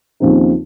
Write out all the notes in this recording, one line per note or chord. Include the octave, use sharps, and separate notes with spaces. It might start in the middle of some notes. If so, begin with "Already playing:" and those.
D#2 C#3 F3 C4 D#4